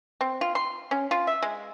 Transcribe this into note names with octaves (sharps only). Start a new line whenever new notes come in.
C4
F4
C6
C#4
F4
E5
G#3